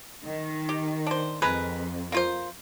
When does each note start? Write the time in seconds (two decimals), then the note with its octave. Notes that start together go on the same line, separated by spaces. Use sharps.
0.24 D#3
0.69 G4
1.07 D4 C5
1.42 F2 G#3 A#4 B4
2.12 A#3 F4 C5